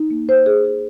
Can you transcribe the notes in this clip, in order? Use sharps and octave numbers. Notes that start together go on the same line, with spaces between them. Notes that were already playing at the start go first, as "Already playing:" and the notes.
Already playing: D#4
A#3
C5
G#4
G#4